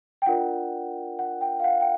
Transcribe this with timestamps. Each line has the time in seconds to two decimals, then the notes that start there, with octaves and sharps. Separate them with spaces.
0.22 G5
0.26 D4 F4 A#4 D5 F#5
1.19 F#5
1.41 G5
1.60 F5
1.64 F#5
1.81 G5